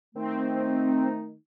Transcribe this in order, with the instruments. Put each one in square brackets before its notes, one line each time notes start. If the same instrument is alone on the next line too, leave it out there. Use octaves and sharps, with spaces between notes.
[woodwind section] D#3 A3 D#4 [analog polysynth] C4